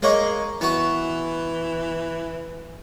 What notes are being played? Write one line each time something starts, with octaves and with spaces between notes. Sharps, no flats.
G#3 A#3 C#5 D#5
E3 B3 F#4